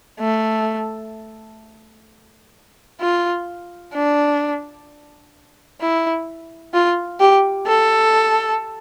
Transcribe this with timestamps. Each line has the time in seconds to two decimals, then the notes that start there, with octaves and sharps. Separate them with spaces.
0.20 A3
3.00 F4
3.94 D4
5.81 E4
6.74 F4
7.20 G4
7.67 A4